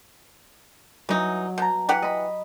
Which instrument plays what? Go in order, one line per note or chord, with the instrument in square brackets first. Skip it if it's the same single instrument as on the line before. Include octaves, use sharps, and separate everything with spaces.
[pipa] E3 D#4 [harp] F#3
[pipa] B2 [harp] A#5 G6
[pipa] E3 G4 F#5
[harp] D#5 B5